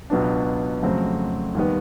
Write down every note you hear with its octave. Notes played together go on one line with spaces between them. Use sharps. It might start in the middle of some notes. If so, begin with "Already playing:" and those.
C#2 B2 F#3 B3 D4
F2 C#3 F#3 A3 C4
D#2 D#3 G3 B3